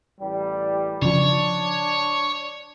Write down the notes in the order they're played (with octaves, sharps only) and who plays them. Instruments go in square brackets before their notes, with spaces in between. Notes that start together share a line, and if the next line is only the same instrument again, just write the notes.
[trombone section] A1 G3
[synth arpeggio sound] C#3 F3 [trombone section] D4 [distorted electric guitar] C#5